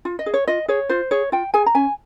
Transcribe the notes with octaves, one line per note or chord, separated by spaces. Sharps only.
F4
D#5
G#4
C#5
F4 D#5
G#4 C#5
F4 C5
G#4 C#5
F4 G5
G#4 G#5
A#5
C#4 G#5